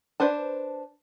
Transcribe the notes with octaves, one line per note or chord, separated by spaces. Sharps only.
D4 B4 C5 A5